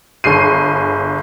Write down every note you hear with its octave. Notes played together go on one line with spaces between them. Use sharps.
G1 G#4 C7 D#7